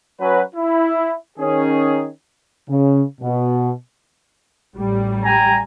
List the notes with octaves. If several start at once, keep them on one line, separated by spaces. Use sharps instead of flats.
F#3 C#4 F#4 B4
E4
D#3 C#4 G#4
C#3
B2
A1 F#3 G3
G5 G#5 A#5